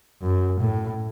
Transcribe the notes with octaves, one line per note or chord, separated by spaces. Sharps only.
F#2
A2